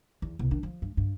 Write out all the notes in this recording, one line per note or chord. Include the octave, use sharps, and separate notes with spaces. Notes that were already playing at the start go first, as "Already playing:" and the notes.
E2
C2 B2
D#3 D4
F3
G2
G2